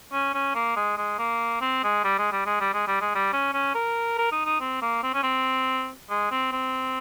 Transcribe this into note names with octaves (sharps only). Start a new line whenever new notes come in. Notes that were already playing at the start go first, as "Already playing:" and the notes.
C#4
C#4
A#3
G#3
G#3
A#3
C4
G#3
G3
G#3
G3
G#3
G3
G#3
G3
G#3
G3
C#4
C#4
A#4
A#4
D#4
D#4
C4
A#3
C4
C#4
C4
G#3
C4
C4